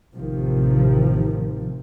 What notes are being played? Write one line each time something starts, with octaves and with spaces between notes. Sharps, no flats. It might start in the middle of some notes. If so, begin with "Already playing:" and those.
A1 C3 D#3 F3